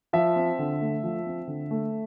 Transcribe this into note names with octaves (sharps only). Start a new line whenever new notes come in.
F3 E5
C4
D3
A3
F3
C4
D3
A3